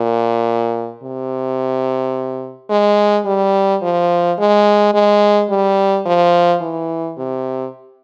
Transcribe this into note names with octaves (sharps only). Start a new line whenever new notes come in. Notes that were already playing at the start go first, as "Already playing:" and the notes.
Already playing: A#2
C3
G#3
G3
F3
G#3
G#3
G3
F3
E3
C3